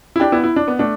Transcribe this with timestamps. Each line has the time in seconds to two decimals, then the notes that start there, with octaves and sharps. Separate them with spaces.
0.16 E4
0.20 D4 G4
0.32 B3 E4
0.44 E4
0.56 D4
0.68 B3
0.79 A3 D4